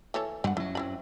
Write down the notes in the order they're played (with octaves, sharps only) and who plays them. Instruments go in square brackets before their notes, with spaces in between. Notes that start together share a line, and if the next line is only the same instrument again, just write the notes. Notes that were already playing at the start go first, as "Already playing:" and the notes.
[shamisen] E3 A4 C#5
[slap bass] G2 [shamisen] C4 F#5
[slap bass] F#2 F#3 [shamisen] E4
[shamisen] C4 E4 B5